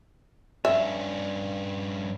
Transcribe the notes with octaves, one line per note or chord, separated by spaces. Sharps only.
G2 C#4 E5